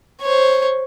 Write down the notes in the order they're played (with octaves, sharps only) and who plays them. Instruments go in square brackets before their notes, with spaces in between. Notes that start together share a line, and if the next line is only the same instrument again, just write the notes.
[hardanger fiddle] C5 C#5